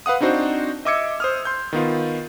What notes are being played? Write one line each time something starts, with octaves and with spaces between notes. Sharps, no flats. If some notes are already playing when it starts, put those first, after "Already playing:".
B4 F5 F#5 D#6
C4 D4 D#4 F#4 C5
D#5 E5 D6 E6 G#6 C#7
C5 D#6 F6
C6 G6
D#3 B3 F4